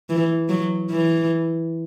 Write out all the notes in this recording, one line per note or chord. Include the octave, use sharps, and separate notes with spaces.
E3
F#3
E3